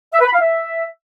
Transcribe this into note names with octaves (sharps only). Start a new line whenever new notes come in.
E5
B4
B5
F5
E5